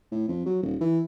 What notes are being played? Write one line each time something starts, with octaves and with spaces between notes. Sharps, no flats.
A2
F2
F#3
D#1
E3